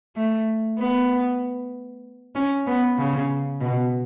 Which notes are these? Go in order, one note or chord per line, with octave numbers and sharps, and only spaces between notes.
A3
B3
C#4
B3
C#3
B2